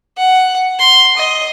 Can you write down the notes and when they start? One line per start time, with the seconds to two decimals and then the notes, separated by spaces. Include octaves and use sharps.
0.18 F#5
0.79 C6
1.17 D#5